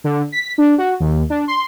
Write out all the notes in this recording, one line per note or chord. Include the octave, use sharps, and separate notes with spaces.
D3
B6
D4
F#4
D#2
D4
C6